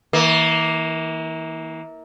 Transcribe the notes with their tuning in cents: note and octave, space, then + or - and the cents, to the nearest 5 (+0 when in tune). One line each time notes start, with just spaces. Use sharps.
E3 -35 A#3 +5